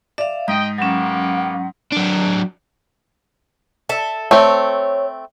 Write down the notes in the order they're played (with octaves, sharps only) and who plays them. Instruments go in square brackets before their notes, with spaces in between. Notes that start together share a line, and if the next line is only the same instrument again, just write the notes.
[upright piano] D5 [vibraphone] E5 F5
[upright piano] G#2 [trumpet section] D#5 G5 [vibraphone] D#6
[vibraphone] F#3 C#4 [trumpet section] A#3 B3 G4 [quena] F#5
[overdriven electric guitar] F#3 D4
[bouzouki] A4 E5
[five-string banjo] A3 C4 [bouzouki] C#5